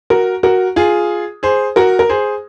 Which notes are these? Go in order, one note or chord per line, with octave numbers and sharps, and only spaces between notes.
F#4 A#4
F#4 A#4
F4 G#4
G#4 C5
F#4 A#4
A#4
G#4 C5